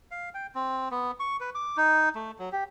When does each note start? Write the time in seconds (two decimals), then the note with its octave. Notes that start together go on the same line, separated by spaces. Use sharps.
0.11 F5
0.34 G5
0.55 C4
0.91 B3
1.20 C#6
1.41 B4
1.55 D6
1.77 D#4
2.15 A3
2.39 F#3
2.52 G4